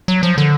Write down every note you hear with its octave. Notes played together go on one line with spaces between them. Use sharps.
F#3
F3
D3